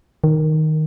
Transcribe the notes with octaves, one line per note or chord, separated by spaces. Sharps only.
D#3